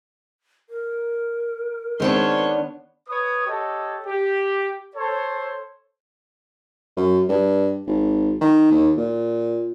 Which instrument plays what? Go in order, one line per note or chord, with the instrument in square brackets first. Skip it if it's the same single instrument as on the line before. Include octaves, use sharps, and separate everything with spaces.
[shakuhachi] A#4
[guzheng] D#3 B3 D4 [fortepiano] G#3 C4 [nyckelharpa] C#5 C6
[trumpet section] B4 C#5 D#6
G4 A4 C#5 D#5
G4
A4 C5 C#5
[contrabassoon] F#2
G2
G#1
D#3
D#2
A#2